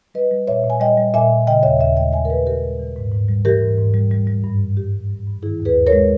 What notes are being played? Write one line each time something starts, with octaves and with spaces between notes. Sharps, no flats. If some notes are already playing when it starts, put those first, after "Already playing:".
G3 B4 D#5
G3
A#2 C#5 E5
A#2
G#5
G3 D#5 G5
G3
A#2 E5 G#5
A#2
C#3 D#5 G5
D#2 C#5 E5
D#2 C#5 E5
G#3 D#5 G5
C#3 E5 G#5
A#4
D#2 G#4 B4
D#2 G4 A#4
G#3
E3
G#2
G#2
G3
E3 G4 A#4
G#2
G#2
G3
G3
G3
G2
G2
G3 G4
G3
G2
G2
D#3 E4 G#4
D#2
G#4 B4
D#2
A#4 C#5
G#3